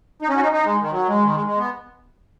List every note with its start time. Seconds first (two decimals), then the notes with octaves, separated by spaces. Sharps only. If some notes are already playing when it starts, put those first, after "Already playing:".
0.22 D#4
0.29 C#4
0.36 F#4
0.41 D#4
0.52 D#4
0.64 G#3
0.81 D#3
0.91 F#3
1.07 G#3
1.23 D#3
1.34 G#3
1.46 G#3
1.58 B3